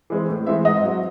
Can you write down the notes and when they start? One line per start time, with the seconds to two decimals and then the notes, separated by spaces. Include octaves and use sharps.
0.10 E3 G#3 C4
0.28 A2
0.46 E3 G#3 C4 E5
0.65 G#2 D#5
0.83 F#3 C4